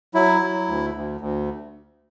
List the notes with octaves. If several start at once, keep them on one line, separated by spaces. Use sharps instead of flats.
F#3 E4
F#3
D2
D2
D2